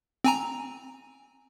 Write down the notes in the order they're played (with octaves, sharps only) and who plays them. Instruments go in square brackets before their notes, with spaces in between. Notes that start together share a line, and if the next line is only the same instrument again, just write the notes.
[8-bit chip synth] C4 G#5 A#5